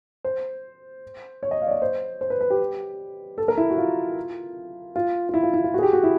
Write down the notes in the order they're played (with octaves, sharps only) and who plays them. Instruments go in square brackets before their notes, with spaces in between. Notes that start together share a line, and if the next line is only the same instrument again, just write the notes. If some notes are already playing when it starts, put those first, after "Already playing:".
[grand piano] C5
C#5
D#5
F5
D5
D#5
C5
C5
B4
B4
G4
A4
A#4
E4
F#4
F4
F4
F4
E4
F4
E4
F4
F#4 G#4
G4
F#4
E4